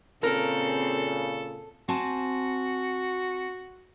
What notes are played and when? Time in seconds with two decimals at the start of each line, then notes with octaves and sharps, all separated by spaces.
0.23 A#2 C#3 C4 A4 A#4
1.89 C4 F#4 G#5 A5